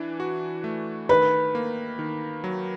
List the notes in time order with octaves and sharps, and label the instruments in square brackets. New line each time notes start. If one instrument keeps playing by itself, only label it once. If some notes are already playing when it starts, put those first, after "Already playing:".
Already playing: [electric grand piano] E3 D4
F#4
A3
[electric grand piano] D#3 [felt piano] B4
[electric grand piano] A#3
D#3
F#3